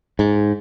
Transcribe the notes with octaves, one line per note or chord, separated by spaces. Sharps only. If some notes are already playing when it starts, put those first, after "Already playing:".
G#2